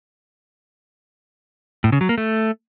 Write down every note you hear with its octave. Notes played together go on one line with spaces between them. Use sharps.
A2
C#3
F#3
A#3
A3